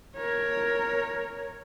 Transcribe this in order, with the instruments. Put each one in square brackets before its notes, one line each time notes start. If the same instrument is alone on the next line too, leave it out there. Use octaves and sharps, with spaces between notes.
[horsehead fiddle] A#4 C#5